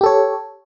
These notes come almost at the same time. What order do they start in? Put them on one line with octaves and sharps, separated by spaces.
G4 A4 C#5